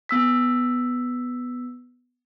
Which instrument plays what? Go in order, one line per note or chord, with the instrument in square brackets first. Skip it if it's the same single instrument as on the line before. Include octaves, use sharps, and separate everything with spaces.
[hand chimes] B3 E6 B6